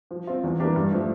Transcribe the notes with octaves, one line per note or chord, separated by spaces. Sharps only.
F3
C4 F4
E2
E3 A#3 D4 G4
G2
F3 A3